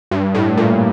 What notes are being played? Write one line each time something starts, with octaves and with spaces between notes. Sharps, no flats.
G2
A2
A#2